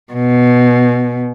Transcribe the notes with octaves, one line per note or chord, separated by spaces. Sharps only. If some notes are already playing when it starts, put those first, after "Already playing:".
B2